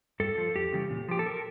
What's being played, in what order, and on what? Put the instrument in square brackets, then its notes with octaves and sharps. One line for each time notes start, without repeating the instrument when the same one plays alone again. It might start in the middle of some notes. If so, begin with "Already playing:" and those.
[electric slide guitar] G2 A4
F3
F2 G4
C#3 E3 G3
A#2
F3 G4
A4
A#4